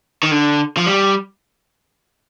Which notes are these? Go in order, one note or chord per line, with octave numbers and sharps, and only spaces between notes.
D#3
D3
F3
G3